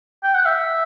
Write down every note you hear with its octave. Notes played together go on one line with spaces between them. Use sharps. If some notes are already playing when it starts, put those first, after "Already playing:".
G5
F#5
E5